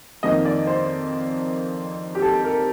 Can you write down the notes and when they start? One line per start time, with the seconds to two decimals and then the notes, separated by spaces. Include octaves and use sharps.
0.23 F2 D#3 A#3 D#5
0.45 D5
0.67 C5
2.15 G4
2.22 A4
2.44 A#4